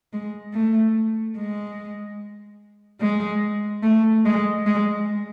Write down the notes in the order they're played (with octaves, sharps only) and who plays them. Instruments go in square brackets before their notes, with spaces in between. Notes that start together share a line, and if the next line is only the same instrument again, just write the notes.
[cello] G#3
A3
G#3
G#3
A3
G#3
G#3